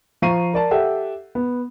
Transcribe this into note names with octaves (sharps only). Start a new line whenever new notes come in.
F3 F5 A#5 C#6 C7 D#7
A#4 D5 A5
G4 A4 E5 F#5 G5
B3